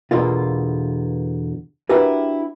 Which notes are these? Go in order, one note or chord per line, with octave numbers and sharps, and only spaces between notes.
E2 B2 D3 A#3 F4
D4 E4 F#4 G4 A#4 B4